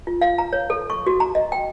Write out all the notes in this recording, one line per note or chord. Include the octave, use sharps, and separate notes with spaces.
F4
F5
A#5
C#5
A4
C#6
F#4
A#5
D#5
G5